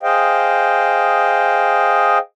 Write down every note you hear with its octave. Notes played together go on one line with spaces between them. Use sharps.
G#4 C5 D#5 F5 G5